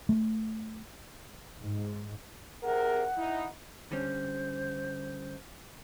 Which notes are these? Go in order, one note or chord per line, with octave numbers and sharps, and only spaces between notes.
A3
G#2
C3 G#4 A#4 F#5
D#4 E4
D3 G3 C#4 C5